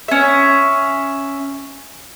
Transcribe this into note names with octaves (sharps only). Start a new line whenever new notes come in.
C#4 E5